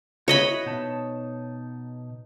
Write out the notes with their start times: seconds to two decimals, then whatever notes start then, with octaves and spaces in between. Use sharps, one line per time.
0.28 E4 F#4 C#5 D#5 B5
0.66 B2 D#4 A5